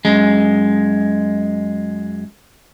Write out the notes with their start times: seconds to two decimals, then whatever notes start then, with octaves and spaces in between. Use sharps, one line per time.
0.05 F#2 G#3